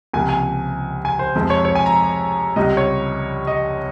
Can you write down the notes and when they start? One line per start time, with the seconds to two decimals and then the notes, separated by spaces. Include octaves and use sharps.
0.14 C#2 C3 F3 A#3 G#5
0.29 G#5
1.05 G#5
1.19 C5
1.36 F2 C3 F3 G#3
1.50 C#5
1.65 C#5
1.75 G#5
1.86 A#5
2.56 C#2 C3 G3 D#5
2.77 C#5
3.47 D#5